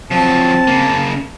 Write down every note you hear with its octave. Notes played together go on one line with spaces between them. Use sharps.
F3 F#3 C4 A5
C#3 A#3